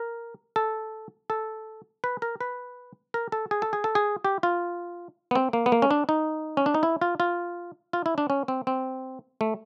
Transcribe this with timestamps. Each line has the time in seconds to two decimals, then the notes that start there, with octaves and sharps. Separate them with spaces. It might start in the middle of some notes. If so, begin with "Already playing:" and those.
Already playing: A#4
0.56 A4
1.30 A4
2.04 B4
2.22 A#4
2.41 B4
3.14 A#4
3.32 A4
3.51 G#4
3.62 A4
3.73 G#4
3.84 A4
3.95 G#4
4.25 G4
4.43 F4
5.31 B3
5.35 C4
5.53 A#3
5.66 B3
5.72 A#3
5.82 C#4
5.91 D4
6.09 D#4
6.57 C#4
6.66 D4
6.74 D#4
6.83 E4
7.01 F4
7.20 F4
7.93 F4
8.06 E4
8.18 D4
8.30 C#4
8.48 C4
8.67 C4
9.41 A3